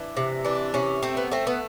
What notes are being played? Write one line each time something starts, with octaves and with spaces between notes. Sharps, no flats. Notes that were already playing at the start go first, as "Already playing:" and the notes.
Already playing: E3 D4
C3
E3 D4
C3 C#4
A3 C4
B3
A3 C4
B3